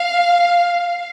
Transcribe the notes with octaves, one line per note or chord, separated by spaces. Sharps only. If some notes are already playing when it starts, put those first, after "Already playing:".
Already playing: F5